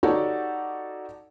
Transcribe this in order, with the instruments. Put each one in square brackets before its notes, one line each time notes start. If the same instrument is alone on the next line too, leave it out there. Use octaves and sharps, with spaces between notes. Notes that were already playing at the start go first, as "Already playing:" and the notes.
[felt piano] D#4 F#4 G4 A4 C#5 D5